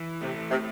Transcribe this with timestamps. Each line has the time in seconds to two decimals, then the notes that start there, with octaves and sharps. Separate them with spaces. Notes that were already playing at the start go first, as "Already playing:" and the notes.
Already playing: E3
0.21 C3 A3
0.51 A2 C3